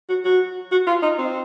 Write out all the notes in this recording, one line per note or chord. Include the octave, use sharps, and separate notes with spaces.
F#4
F#4
F#4
F4
D#4
C4